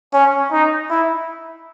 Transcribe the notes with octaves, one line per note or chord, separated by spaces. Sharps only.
C#4
D#4
E4